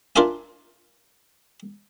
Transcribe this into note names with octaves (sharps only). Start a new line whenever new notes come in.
D4 F4 A#4 D5 E5 G#5